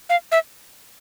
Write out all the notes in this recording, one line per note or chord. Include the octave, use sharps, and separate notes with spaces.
F5
E5